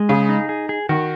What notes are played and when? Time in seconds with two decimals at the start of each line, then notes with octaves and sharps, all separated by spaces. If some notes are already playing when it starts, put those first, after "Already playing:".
Already playing: G#3
0.09 C#3 G#4
0.29 D#4
0.49 G#4
0.69 G#4
0.89 D#3 F#4